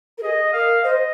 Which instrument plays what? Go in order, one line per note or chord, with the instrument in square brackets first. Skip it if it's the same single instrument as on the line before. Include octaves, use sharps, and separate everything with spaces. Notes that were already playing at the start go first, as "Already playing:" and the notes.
[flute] A#4
[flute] G#4 [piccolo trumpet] D#5
[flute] A#4 [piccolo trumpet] F5
[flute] C5 [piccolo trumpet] D#5